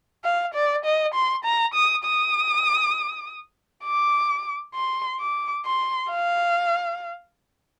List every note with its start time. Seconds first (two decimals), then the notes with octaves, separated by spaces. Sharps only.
0.24 F5
0.54 D5
0.85 D#5
1.14 C6
1.45 A#5
1.74 D#6
2.04 D#6
3.85 D6
4.75 C6
5.20 D6
5.65 C6
6.10 F5